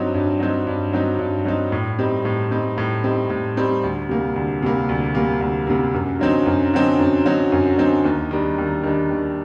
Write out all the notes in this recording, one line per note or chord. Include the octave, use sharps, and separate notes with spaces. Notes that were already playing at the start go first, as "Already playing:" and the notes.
Already playing: G2 F#3 C4 D#4
G2
F#3 C4 D#4
G2
F#3 C4 D#4
G2
F#3 C4 D#4
A2
G3 C4 D#4
A2
G3 C4 D#4
A2
G3 C4 D#4
A2
G3 C4 D#4
D2
C3 G3 A#3
D2
C3 G3 A#3
D2
C3 G3 A#3
D2
C3 G3 A#3
F#2
D3 F#3 C4 D#4
F#2
D3 F#3 C4 D#4
F#2
D3 F#3 C4 D#4
F#2
D3 F#3 C4 D#4
D#2
D#3 G3 D4
D#2
D#3 G3 D4
D#2